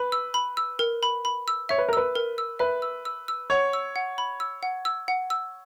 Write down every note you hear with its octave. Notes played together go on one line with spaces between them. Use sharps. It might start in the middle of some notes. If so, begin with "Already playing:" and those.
Already playing: B4 B5
E6
B5
E6
A#4
B5
B5
E6
C#5 E5
B4
A#4
B4 E6
A#4
E6
B4 E5
E6
E6
E6
C#5 F#5
E6
F#5
B5
E6
F#5
E6
F#5
E6